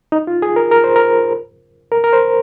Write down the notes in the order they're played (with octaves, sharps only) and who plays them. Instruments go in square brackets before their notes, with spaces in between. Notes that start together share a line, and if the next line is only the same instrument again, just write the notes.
[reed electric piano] D#4
F4
G#4
A#4
A#4
C5
A#4
A#4
A#4
C5